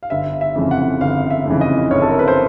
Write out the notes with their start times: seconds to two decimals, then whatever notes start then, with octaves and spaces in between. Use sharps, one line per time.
0.03 F5
0.10 G1 E5
0.41 E5
0.56 F2 C#3 E3
0.71 F#5
1.01 G1 F5
1.30 E5
1.46 F2 C#3 E3
1.61 D#5
1.91 G1 C#5
2.02 A4
2.10 A#4
2.19 B4
2.28 C5